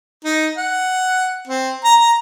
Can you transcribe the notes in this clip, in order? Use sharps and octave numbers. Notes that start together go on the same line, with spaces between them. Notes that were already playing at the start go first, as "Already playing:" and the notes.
D#4
F#5
C4
A#5
A#5